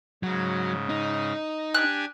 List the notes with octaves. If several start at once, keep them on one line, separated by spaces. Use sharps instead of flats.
G#2 C#3 F#3
D#4
D4 G4 G#5 F#6